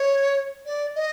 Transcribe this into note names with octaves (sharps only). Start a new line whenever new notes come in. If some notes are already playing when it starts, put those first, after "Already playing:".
Already playing: C#5
D5
D#5